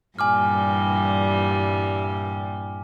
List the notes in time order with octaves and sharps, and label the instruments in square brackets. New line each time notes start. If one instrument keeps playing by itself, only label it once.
[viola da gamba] G2 A#2 [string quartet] E3 G3 [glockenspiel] G#5 D6 F6